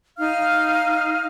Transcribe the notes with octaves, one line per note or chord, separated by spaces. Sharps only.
D#4 F5 F6